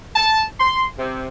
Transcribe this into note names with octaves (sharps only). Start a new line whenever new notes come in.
A5
C6
C3